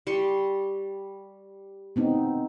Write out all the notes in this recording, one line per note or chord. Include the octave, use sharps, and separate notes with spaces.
G3 C6 C#6
B3 C4 D#4